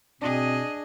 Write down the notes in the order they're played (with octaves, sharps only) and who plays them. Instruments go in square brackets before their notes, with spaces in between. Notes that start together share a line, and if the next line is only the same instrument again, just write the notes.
[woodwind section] B2 C4 [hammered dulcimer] D4 [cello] G#4 D#5